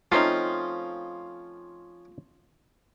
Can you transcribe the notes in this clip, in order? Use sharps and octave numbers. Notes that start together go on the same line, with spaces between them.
F3 A3 C4 C#4 D#4 F4